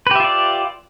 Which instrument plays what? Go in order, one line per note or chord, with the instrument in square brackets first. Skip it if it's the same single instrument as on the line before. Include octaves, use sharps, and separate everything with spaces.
[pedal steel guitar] B4
G4
E5
F4
D5